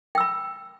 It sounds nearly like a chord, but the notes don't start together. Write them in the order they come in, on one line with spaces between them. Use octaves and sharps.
G5 E6 B5